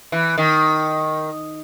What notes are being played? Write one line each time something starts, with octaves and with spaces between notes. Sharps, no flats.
E3
D#3